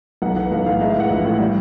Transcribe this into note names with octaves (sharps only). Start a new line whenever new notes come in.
B1 F#5
E3 F#5
B1 F5
A2 F5
G#3 E5
F5
E3 F#5
A#1
A2
G3